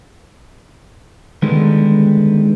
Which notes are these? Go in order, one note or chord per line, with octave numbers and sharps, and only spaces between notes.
D3 D#3 G3 G#3 B3